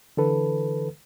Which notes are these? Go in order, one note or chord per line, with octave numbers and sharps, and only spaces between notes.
D3 E3 A4 B4